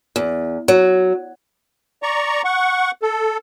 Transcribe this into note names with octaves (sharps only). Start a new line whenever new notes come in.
E2
F#3
D5 A#5 C#6
F#5 C#6
A4